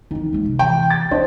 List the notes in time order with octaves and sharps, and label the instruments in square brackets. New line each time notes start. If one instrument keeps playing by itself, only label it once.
[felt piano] D#3 [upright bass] E3 F#3
[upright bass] G#3 A#3
C3
[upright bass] E3 [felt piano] G5
[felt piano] A6
[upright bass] C#4 F4 [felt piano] D4 C5 D#5